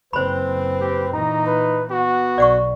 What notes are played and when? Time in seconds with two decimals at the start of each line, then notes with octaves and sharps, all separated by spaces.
0.13 F#1 C4 B4 C5 B5
0.80 G4
1.14 A#2 E3 D#4 A#5
1.46 B4
1.91 B3 F#4
2.38 B1 D5 F#5 C#6